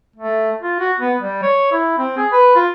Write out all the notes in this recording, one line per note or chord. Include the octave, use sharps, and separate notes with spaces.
A3
F4
F#4
B3
G3
C#5
E4
C4
G#4
B4
F4